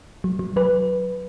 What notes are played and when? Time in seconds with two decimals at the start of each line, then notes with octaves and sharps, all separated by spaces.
0.24 F#3
0.39 F#3
0.56 F#3 B4